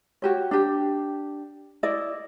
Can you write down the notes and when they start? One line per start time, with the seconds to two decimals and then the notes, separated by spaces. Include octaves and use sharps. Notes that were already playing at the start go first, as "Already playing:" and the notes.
0.22 F#4 G4 C#5
0.51 D4 G4
1.83 E4 D5 D#5